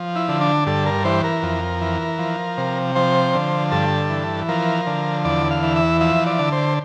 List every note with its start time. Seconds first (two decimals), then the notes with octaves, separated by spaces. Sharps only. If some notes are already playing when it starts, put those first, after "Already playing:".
Already playing: F3
0.16 E4
0.29 D3
0.41 D4
0.66 G2 A4
0.86 A#4
1.04 E3 C5
1.24 A#4
1.43 F2
1.81 E3
2.19 F3
2.58 C3
2.96 F3 C5
3.34 D3
3.72 G2 A4
4.10 E3
4.49 F3 A#4
4.87 D3
5.25 E2 D5
5.51 F5
5.63 E3
5.76 E5
6.01 F3 E5
6.26 D5
6.39 D3
6.52 C5